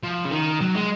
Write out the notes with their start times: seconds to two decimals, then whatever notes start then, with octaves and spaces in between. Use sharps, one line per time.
0.03 F3
0.25 C#3
0.32 D#3
0.61 F#3
0.75 G#3